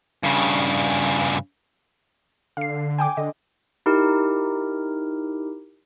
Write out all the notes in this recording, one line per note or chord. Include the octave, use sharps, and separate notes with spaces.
G2 C#3
D3 F5 C7
G5 G#5 D6
D3 D#5
D#4 E4 G4 A#4